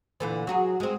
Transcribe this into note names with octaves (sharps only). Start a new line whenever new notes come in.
A#2 D3 E3
F#3 F#4 G#4
G#3 C4